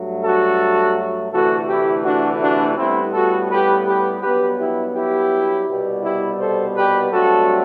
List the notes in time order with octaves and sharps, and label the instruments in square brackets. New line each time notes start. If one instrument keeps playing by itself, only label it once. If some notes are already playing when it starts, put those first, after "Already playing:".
Already playing: [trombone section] G2 F#3 A3
F#4 A4
D2 C3 E3 A3 F#4 A4
E4 G4
D4 F#4
D4 F#4
A2 G3 B3 C4 E4
F#4 A4
G4 B4
G4 B4
G2 F#3 B3 G4 B4
E4 G4
E4 G4
C2 B2 G3 B3
E4 G4
A4 C5
G4 B4
G2 F#3 A3 C4 F#4 A4